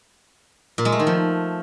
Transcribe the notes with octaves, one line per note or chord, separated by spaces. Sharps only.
A#2
G#3
A3
D#3
F3